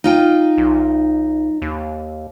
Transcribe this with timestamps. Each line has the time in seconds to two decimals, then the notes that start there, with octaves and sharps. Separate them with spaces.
0.04 D#4 F4 G5
0.58 B1
1.62 D#2